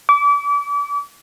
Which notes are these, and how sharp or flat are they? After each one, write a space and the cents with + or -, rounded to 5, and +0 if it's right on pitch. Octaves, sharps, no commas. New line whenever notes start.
D6 -35